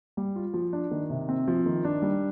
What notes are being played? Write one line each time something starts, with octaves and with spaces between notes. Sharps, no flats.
G3
F4
F3
D4
D#3
C3
C4
F3
D#3
D4
G3